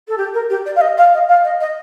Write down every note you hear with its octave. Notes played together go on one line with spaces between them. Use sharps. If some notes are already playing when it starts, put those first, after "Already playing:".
A4
G4
A#4
G4
D5
F5
D#5
F5
D#5
F5
D#5
D#5